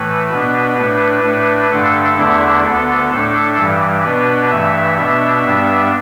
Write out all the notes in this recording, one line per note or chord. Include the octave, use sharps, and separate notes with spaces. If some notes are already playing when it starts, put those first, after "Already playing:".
Already playing: A2 E3 A3 B4
B2 B3 D4
A2 A3 D4
A2 A3 D4
G2 D3 A3 D4 A4
E2 D3 A3 D4 E4
D2 D3 B3 A4
A2 A3 D4
G2 E3 G3
B2 B3 D4 B4
G2 E3 A3 E5
B2 B3 D4 E5
G2 G3 B3 D4